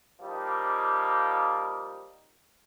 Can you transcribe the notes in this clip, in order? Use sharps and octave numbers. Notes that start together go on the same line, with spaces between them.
F3 G3 A#3 D#4